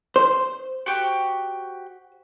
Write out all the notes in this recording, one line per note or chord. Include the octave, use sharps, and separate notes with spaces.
C5
F#4 G4